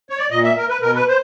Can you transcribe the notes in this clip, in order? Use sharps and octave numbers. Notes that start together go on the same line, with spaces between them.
C#5
D5
A#2 D#5
E5
A#4
B4
B2 A#4
B4
C5